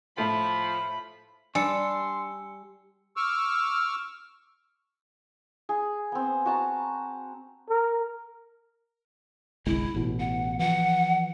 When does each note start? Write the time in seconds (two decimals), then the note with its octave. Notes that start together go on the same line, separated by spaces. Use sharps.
0.17 A2 F3 A3 A5 B5
1.55 G3 D4 G#5 C6 E6 C#7
3.17 C#6 D6 E6 F6
5.69 G#4
6.12 B3 C4
6.46 F#4 A5 A#5
7.69 A#4
9.66 G1 C2 G#3 E4
9.95 A1 B2
10.20 F#5
10.59 E3 F3 F#5